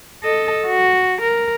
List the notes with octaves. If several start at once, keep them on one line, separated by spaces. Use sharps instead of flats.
A4 D#5
F#4
A#4